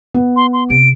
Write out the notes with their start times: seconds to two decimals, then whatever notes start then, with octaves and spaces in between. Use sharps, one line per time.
0.14 B3
0.36 C6
0.53 C6
0.70 C3 C4 D7